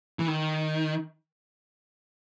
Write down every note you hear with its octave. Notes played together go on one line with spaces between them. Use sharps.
E3
D#3